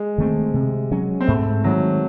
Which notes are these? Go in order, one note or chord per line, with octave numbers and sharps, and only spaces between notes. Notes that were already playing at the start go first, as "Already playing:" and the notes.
Already playing: G#3
D#3 A3 C4
C3
F#3 C#4
C4
G#2 A3
D#3 F#3 G#3 C4